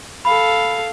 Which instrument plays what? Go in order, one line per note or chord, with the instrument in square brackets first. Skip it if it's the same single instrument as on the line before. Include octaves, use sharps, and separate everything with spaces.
[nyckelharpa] A4 F5 [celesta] B5